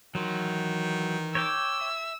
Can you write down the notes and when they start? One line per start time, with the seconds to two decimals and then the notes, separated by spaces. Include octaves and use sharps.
0.15 D#3 E3 F#3 C6
1.35 C#5 G5 D6 E6
1.82 E5